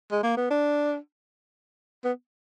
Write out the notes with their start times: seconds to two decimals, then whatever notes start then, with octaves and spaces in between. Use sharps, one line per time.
0.11 G#3
0.23 A#3
0.37 B3
0.50 D4
2.04 B3